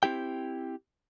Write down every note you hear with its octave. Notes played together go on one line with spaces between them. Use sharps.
C4 E4 G4 G5